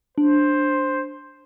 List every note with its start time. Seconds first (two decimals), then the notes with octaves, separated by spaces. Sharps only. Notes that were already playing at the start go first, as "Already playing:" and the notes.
0.18 D4 C5